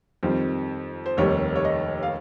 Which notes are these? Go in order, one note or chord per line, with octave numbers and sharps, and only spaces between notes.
F2 D#3 G3 C5
C5
F1 D#2 D#3 G3 C#5
C#5
D#5
F5